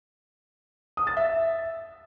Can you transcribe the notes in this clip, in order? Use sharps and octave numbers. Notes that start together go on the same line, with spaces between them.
D#6
A6
E5